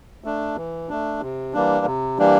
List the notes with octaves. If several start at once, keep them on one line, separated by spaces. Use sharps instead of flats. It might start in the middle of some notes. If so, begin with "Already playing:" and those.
A3 D4
E3
A3 D4
C3
E3 G3 A#3 D4
C3
E3 G3 A#3 D4